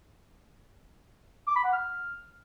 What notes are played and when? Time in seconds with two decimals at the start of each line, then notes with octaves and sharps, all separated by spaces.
1.47 D6
1.56 B5
1.64 F#5
1.73 F6